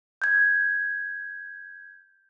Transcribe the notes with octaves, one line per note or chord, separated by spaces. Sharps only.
G6 G#6